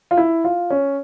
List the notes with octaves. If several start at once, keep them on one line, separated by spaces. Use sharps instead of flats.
F4
E4
F4
C#4